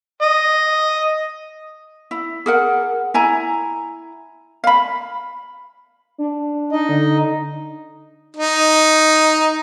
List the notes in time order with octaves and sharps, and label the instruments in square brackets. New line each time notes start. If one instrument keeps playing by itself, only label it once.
[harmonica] D#5
[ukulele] E4
G#4 A#4 F#5
E4 G#5 A#5
F5 B5
[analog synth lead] D4
[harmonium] D#4 D#5
[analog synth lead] D3
[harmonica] D#4